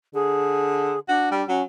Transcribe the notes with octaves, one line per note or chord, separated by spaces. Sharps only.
D3 G#4
D4 F#4
G3
F#3 C#4